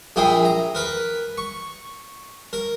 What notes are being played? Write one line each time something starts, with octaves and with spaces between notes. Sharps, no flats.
A#1 A#2 E4 G#4 G5 D#6
A#5
A#4 B4 B5
C#6
A#4